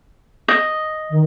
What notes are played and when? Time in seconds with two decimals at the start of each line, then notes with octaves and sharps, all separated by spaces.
0.48 D#5
1.10 D#3